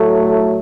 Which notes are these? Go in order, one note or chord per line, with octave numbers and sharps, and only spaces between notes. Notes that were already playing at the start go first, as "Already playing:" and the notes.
Already playing: A2 F#3 A3